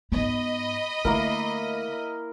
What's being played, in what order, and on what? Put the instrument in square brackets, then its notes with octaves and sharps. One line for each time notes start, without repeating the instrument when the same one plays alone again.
[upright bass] G#2 B3 [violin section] D#5 B5
[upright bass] D3 A3 [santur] A#3 E4 A#4